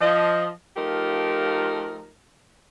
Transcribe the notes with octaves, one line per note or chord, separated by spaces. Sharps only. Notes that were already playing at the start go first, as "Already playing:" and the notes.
F3 D#5
F3 A3 D#4 F4 G4 A#4